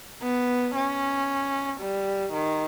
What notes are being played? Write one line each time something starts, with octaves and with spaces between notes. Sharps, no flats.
B3
C#4
G3
D#3